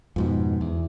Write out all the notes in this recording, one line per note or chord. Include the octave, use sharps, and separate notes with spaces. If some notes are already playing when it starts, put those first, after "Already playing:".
F2 G#2 B2
E2